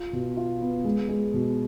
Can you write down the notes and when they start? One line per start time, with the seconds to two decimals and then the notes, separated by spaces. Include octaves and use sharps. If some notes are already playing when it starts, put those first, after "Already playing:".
Already playing: F4
0.13 B2
0.37 F4
0.61 B3
0.84 G#3
1.09 G#3
1.34 B2